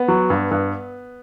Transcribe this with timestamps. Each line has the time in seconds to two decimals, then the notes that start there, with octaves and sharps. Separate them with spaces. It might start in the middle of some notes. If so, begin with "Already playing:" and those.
Already playing: B3
0.08 F#3
0.30 G2
0.51 G2